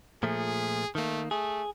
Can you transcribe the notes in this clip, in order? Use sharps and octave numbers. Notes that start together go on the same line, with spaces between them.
A#2 F3 A3 G#4
D#3 A3 A#3
A3 G#4